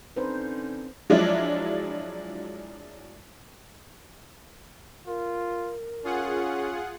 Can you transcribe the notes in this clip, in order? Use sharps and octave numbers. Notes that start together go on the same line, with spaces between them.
D3 C4 C#4 D#4 B4 C5
F3 F#3 G#3 D4 E4 F4
F4 A#4
C#4 F4 G#4 F#5